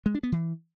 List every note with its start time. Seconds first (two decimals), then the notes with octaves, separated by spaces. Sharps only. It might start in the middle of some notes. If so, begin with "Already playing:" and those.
0.06 G#3
0.15 D4
0.23 B3
0.32 E3